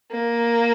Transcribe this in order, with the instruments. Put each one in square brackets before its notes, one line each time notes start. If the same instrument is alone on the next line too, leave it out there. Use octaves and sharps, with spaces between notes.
[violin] A#3